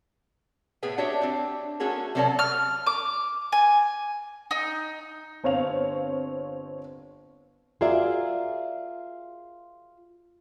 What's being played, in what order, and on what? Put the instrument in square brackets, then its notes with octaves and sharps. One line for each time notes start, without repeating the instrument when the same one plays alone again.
[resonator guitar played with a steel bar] A2 B3 G#4 B4 G5
D4 F#4 G4 C#5 E5
C4 D4
A3 C#4 F#4 G#4 A#4
C3 F#3 C#4 A#4 D5 A5
[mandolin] F6
D6
G#5
D#4
[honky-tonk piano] G1 C4 C#5 F5 F7
[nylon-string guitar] F4 F#4 G#4 A#4 D5 E5